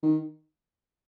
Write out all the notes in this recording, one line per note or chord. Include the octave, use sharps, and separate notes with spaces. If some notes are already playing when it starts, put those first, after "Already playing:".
D#3